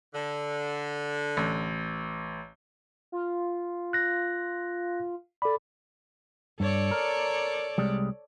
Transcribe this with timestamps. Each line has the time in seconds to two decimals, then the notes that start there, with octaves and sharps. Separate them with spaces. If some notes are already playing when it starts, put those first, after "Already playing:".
0.14 D3
1.37 A1
3.12 F4
3.93 F#6 A#6
5.42 A4 D5 B5
6.60 G2 A4 C#5 D5
6.91 A#4
7.78 C2 G3 G#3